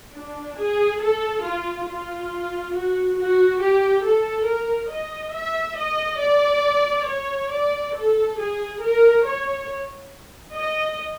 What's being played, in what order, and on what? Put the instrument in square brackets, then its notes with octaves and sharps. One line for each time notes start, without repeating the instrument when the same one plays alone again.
[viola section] D4
G#4
A4
F4
F4
F#4
F#4
G4
A4
A#4
D#5
E5
D#5
D5
C#5
D5
A4
G#4
A#4
C#5
D#5